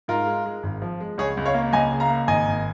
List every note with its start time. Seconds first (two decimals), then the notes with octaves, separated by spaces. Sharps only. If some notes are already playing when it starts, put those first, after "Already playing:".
0.08 G#2 F4 A#4
0.27 G#3
0.46 G#3
0.63 G#1
0.82 F3
1.01 G#3
1.18 C#2 G#4 C#5
1.37 C#2
1.46 C#5 F5
1.54 A#3
1.73 C#2 D#5 G#5
1.91 C#3
2.00 F5 A#5
2.10 A#3
2.27 G#1 D#5 G#5
2.47 G#1